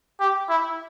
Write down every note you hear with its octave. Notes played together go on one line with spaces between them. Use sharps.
G4
E4